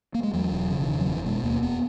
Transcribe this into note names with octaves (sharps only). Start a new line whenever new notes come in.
A#3
G#3
E2 F#3
E1
C#3
E3
E2 D#3
F#3
F#1 E3
B2 G#3
D#2 A#3
E1 B3